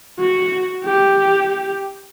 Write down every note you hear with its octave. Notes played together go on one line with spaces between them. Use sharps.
F#4
G4